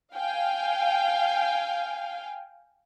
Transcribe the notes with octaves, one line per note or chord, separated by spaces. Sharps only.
F5 G5 G#5